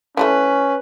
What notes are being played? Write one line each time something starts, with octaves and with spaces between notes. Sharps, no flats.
E3 G#3 A3 C#4 B4